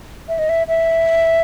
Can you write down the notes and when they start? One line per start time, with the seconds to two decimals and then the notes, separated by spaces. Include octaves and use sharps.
0.29 E5
0.39 D#5
0.49 E5
0.68 E5